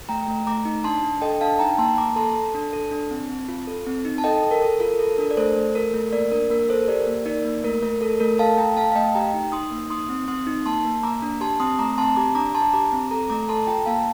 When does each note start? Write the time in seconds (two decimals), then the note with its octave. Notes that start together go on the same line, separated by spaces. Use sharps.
0.09 A3 G5 A#5
0.28 A3
0.47 A3 A#5 D6
0.65 D#4
0.84 D4 A5 C6
1.03 D4
1.21 A4 D#5 G5
1.41 D4 F5 A5
1.59 D#4 G5 A#5
1.78 A#3 A5 C6
1.98 A#3 A#5 D6
2.09 A#5
2.16 A4 A5 C6
2.35 A4
2.54 D4
2.73 A4
2.91 D4
3.11 C4
3.29 C4
3.48 F4
3.67 A4
3.86 C4
4.05 D#4
4.18 A5
4.24 A4 D#5 G5
4.42 A4
4.51 A#4
4.62 A4
4.80 F4 A#4
4.99 A4
5.18 D4 A#4
5.31 D5
5.37 A3 A4 C5
5.57 A3
5.75 A4 A#4
5.94 A3
6.13 A#3 A#4 D5
6.31 D4 A#4
6.50 A#3 A#4
6.69 A4 C5
6.88 G4 A#4 D5
7.07 A#3
7.26 D#4 A#4 D5
7.44 A#3
7.64 A3 A#4
7.83 A3 A#4
8.01 A4 A#4
8.20 A3 A#4
8.39 A4 F5 A5
8.58 A3 G5 A#5
8.77 A3 F5 A5
8.92 F5
8.95 A3 D#5 G5
9.15 G4 G5 A#5
9.34 D#4
9.52 D#4 C6 D#6
9.71 A#3
9.90 D#4 C6 D#6
10.09 C4
10.28 C4 C6 D#6
10.47 D#4
10.66 A#3 A5 C6
10.85 A#3
11.03 A#3 A#5 D6
11.22 D4
11.41 G4 A5 C6
11.60 C4 C6 D#6
11.79 A3 A#5 D6
11.98 C4 A5 C6
12.16 G4 A#5 D6
12.35 D4 A#5 D6
12.55 D4 A5 C6
12.73 G4 A#5 D6
12.92 C4
13.11 A4 A#5 D6
13.30 A3 A#5 D6
13.49 A4 A5 C6
13.67 F4 G5 A#5
13.86 A#3 F5 A5